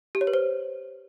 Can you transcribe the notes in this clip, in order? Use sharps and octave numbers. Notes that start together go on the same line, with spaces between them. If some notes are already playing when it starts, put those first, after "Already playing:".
G4
C#5
B4
C5